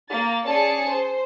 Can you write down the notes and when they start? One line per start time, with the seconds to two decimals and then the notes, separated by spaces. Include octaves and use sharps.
0.10 A#3 A6
0.45 C#4 G#4 D5 G#5 A5 C#7
0.88 C5